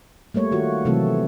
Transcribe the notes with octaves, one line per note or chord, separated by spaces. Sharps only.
G3 A3 A#3 C#5
D#3 F4 F#4
C3 E3 F#3 A3 C4 A4